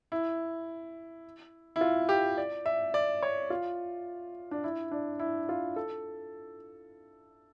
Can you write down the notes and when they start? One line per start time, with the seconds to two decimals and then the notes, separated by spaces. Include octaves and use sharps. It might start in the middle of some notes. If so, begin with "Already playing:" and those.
0.12 E4
1.76 E4
1.81 F4
2.09 G4
2.38 D5
2.66 E5
2.94 D5
3.23 C#5
3.50 F4
4.51 D4
4.64 E4
4.91 D4
5.19 E4
5.49 F4
5.76 A4